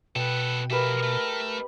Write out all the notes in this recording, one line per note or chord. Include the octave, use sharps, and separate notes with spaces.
B2 B3 A4 B4 G5
F3 G4 A#4 B4 E5
A3